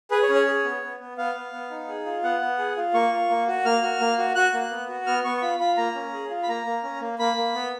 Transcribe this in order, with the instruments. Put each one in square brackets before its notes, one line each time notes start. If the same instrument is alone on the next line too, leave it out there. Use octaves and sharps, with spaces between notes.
[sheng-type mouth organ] G#4 B4
C#5
C#4
C#5
G#4
B3
B3
B3
B3 F5
B3
B3
D#4
G#4
F4
B3 F#5
B3
G#4
F4
A#3 C#6
F4
A#3
F#4
A#3 F6
F#4
A#3
F#4
F#4 F#6
A#3
B3
F#4
B3 F6
B3 C#6
C#6
F4 B5
F4 B5
A#3 A#5
C#4
G#4
F4
B5
A#3 A#5
A#3
C#4
A#3
A#3 B5
A#3
B3